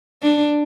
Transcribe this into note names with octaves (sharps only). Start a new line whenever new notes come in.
D4